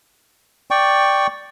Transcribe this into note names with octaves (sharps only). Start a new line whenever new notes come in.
D5 G5 C#6